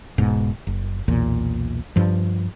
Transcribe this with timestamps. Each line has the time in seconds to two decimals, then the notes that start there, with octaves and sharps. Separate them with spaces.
0.18 E1 G#2 B2
0.67 F#1
1.08 B1 E2 A#2
1.96 G2 F3